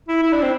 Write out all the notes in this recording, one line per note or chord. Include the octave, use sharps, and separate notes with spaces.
E4
E4
D4
C4